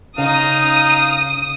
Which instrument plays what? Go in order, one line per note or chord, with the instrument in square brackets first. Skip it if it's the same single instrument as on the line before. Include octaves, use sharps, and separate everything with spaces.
[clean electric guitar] C#3 [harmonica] D#4 F5 A#5 [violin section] D#6